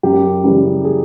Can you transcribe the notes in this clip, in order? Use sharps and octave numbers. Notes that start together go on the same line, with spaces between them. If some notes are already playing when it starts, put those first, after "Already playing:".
F#2 G4
C#3 E3 G3 G4
G#4